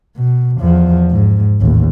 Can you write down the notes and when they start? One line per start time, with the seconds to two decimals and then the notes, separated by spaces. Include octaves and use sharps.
0.16 B2
0.60 E2 F3
1.10 G#2
1.61 A1 D#2